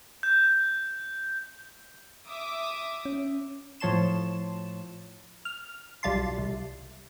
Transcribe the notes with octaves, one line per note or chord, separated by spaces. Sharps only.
G6
E5 D6 D#6
C#4
A2 F3 C#5 A5 C6 E7
F6
B1 G3 F4 A5 C6
C2